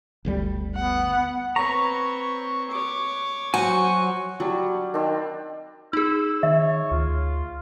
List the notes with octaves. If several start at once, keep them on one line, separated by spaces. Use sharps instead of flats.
G1 D2 G3
B3 F#5
C4 B4 C#5 A#5 C#6
C#5 D6
F#3 F#4 C5 G#5 C#6
F#3 G3 D4
D#3 C4 D4
D#4 G#4 E6
D#3 C#5 E5
D2 F4